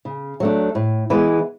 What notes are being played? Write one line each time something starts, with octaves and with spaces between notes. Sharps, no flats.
C#3
F#3 A3 D4
A2
E3 G#3 B3